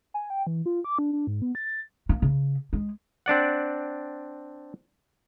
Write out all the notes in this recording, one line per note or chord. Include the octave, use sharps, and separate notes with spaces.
G#5
G5
E3
F4
D6
D4
D4
G#2
B3
A6
A#3
C#3
G#3
C4 D4 D5 F#5